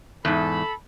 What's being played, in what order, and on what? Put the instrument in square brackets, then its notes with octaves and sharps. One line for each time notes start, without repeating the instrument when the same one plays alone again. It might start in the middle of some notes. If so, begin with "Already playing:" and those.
[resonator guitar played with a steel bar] E2 G#2 [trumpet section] A4 B5